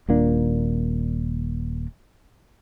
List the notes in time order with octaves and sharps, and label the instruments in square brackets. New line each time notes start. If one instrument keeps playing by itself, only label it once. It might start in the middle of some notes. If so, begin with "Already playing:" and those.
[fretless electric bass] D#1 A#2 A#3 D4